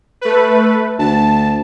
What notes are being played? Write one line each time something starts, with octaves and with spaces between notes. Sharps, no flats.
A3 B4
D2 A5